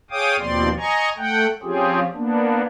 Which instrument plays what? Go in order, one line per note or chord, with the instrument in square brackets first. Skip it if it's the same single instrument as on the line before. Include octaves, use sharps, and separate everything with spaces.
[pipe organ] G#4 C#5 F5 G5 D6 D#6
D#2 B2 F3 C4 D5 C6
D#5 G#5 A#5 C#6
A3 F#5 G5
F3 C4 C#4 F4 G4 G#4
A#3 B3 D4